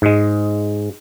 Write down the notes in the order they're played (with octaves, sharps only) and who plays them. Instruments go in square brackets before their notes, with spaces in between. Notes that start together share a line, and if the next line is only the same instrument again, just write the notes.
[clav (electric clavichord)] G#2 G#3